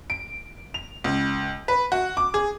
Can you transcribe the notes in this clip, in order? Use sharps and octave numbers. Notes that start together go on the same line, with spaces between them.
D7
F7
C#2
B4
F#4
D6
G#4